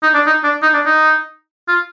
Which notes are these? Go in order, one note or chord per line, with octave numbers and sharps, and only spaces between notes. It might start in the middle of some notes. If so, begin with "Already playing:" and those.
D#4
D4
D#4
D4
D#4
D4
D#4
F4